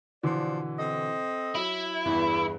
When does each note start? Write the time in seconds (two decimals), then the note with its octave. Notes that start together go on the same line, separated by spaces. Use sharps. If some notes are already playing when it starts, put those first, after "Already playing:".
0.23 B2 D3 E3 F3 D5
0.78 C4 A4 D#5
1.55 F#3 E4
2.06 E2 G2